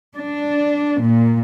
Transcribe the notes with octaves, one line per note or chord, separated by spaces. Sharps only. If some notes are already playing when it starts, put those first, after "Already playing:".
D4
A#2